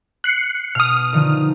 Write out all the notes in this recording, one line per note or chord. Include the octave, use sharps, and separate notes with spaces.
F#6 C7 C#7
B2 D#6 F6
D3 D#3 F3